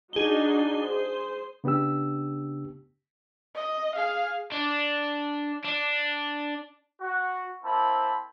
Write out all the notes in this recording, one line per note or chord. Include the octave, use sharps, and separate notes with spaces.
D4 D#4 F#4 G#4 G7
C5
C#3 B3 D4 G4 E6
D#5
G#4 F5
D4
D4
F#4
A#3 C4 E4 C5 A5 B5